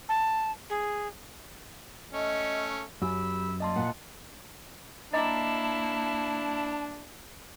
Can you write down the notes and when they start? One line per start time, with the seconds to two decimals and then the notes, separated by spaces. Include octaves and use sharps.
0.09 A5
0.70 G#4
2.13 A3 C#4 D#5
3.02 F#2 G4 B5 E6
3.60 G3 A#3 D#5 A5 C6
3.76 A#2 F#5
5.13 A#3 D4 E4 D#5 A5 A#5 D6